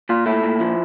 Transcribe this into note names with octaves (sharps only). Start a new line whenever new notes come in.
A#2 F4
A3 E4
A#2
F3